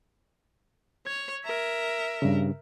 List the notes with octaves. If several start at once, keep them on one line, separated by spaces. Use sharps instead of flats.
C#5 G#6
A#4 E5
G2 C#3